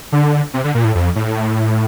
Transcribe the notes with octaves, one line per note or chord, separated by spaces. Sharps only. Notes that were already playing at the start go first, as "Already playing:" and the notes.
D3
C3
D3
A#2
A2
F2
A2